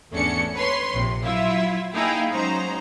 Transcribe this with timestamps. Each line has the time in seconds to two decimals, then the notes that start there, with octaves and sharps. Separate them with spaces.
0.11 G#1 E2 A3 C#4 D4 C#7
0.54 B4 C#5 C6
0.94 A#1 C3
1.24 F#3 E4 F4 E5
1.95 A#3 D#4 E4 G#4 F5 G5
2.31 F#3 G#3 C#4 D#4 C5 A#5